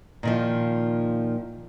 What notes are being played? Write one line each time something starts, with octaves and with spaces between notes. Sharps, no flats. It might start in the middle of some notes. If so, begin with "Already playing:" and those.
A#2 D#3 F3